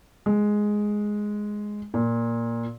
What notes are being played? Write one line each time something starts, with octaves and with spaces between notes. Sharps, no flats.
G#3
A#2